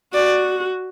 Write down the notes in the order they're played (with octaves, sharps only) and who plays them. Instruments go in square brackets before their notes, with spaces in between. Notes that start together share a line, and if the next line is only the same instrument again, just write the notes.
[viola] F#4 [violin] D5